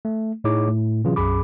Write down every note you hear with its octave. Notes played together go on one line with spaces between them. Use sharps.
A3
A2 D#4 E4 G#4 C#5 D6
A2
C3 E3 F#3 C#4 F4 G#4
B1 F#2 G#4 B5 D6